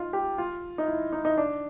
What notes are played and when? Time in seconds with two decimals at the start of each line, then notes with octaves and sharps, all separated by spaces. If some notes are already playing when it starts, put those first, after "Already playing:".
Already playing: D#4 F4
0.13 G4
0.38 F4
0.78 D#4
0.87 E4
1.12 D#4
1.25 D#4
1.37 D4